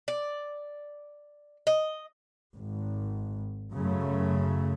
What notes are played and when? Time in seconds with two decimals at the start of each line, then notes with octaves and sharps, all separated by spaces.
0.08 D5
1.67 D#5
2.55 G#1
3.72 F#2 C#3 A3